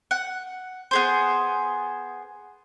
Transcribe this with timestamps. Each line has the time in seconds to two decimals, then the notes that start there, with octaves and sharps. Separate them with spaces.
0.11 F#5
0.91 B3 G#4 C5